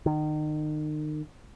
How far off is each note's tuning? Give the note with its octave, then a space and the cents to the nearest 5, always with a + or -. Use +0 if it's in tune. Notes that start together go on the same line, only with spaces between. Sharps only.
D#3 -35